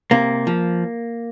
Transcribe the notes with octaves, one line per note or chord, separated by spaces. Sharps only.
C3 A#3
F3